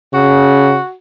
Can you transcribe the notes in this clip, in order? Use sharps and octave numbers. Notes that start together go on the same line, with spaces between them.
C#3 F#4